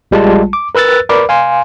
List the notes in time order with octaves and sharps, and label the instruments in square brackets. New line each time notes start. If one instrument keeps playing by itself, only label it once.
[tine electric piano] A#1 G3 G#3 F4 A5
D6
A#4 B4 E6 F#6 A6
A#4 B4 D5 B5 D6
F5 G#5 C6